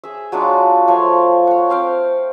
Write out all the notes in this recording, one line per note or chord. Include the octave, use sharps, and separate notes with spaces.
G#4 E5
F#3 G#3 D4 F4
F3 A3 C#5 C6
C#5 F#5
C4 F5 G5